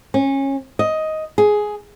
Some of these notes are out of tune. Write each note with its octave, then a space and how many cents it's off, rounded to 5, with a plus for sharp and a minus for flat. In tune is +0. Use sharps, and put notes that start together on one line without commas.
C#4 -20
D#5 +10
G#4 +10